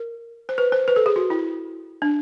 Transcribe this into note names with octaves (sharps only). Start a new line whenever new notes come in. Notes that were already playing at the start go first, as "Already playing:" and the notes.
Already playing: A#4
C5
B4
C5
B4
A4
G#4
F#4
E4
D4